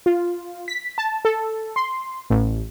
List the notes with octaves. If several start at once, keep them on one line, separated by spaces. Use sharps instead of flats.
F4
B6
A5
A4
C6
A1